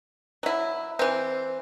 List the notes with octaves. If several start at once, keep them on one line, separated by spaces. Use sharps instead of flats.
F#3 E4
E3 C4